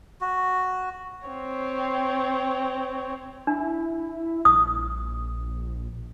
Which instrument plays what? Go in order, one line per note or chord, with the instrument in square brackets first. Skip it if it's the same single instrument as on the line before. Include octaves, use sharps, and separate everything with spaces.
[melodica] F#4
[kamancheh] C4 C#5
[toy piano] D4 [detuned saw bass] E4
[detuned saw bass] A#1 [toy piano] D#6